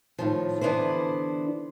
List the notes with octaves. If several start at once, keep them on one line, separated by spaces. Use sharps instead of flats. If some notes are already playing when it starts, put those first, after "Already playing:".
A2 D#3 F3
D3 E3 B3 D4 E4 C5